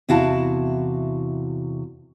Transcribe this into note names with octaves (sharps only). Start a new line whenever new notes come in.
E2 C3 E4 F#4 F5 A5